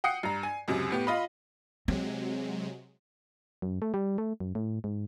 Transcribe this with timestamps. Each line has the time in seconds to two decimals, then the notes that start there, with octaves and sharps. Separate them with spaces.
0.04 F#5 G5 D#6 C7 C#7
0.23 G2 A#5
0.43 G#5
0.68 C#2 F#2 C3
0.91 A2 B3 G4
1.07 F4 D#5 F5 B5
1.88 C3 F#3 G#3 C4
3.62 F#2
3.82 A3
3.94 G3
4.18 A3
4.40 F#2
4.55 A2
4.84 G#2